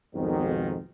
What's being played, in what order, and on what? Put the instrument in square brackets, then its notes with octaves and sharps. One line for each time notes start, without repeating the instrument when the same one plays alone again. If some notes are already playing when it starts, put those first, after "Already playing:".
[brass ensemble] B1 F2 G#2 D#3